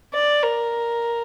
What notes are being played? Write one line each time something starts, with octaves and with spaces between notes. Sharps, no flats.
D5
A#4